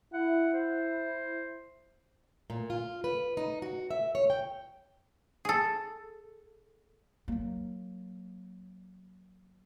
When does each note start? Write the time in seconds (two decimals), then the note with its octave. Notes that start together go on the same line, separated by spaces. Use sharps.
0.13 E4 F#5
0.53 C5
2.50 A#2
2.70 F4
3.04 B4
3.37 D#4
3.62 F#4
3.90 E5
4.15 C#5
4.30 G5
5.45 G#4 A4
7.28 F#3 A#3